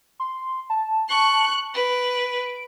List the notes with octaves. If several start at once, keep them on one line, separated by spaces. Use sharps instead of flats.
C6
A5
C#6 F#6
B4 D7